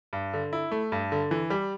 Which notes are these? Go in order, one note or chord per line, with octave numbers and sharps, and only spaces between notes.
G2
D3
E4
A3
G2
D3
E3
G3